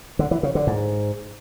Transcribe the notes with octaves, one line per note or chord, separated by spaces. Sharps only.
D3
E3
C#3
D3
G#2